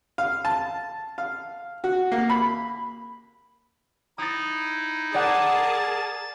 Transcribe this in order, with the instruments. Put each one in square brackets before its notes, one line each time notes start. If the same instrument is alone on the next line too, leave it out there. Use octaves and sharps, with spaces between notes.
[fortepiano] F5
A5
F5
F#4
A#3
B5
[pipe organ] D#4 E4 [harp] D#6 A6
[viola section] G#4 A#4 A5 [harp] D5 F#5
[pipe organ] A6